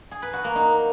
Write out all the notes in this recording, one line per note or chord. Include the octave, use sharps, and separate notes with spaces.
G#4
B4
F#4
A#3
D#4